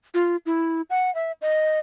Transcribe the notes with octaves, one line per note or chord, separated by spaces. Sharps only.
F4
E4
F#5
E5
D#5